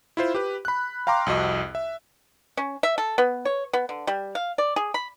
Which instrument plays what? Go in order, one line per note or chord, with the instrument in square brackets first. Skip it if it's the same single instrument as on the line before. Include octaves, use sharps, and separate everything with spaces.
[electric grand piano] E4 F4 C5
G4 B4
B5 F#6
F5 G5 A#5 C6 D6
C2 F2 F#4 D#5
E5
[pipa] C#4
E5
A4
B3
C#5
B3
D3
G3
F5
D5
G#4
B5